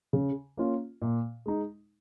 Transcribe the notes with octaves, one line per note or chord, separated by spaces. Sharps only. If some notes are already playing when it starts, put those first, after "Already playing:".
C#3
A#3 C#4 F4
A#2
G#3 D#4